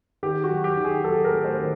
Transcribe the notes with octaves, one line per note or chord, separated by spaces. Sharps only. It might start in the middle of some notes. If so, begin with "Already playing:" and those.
D#3 G4
F#4
F#3
G4
D#3
G#4
F#3 A4
A#4
A3
C5
D#3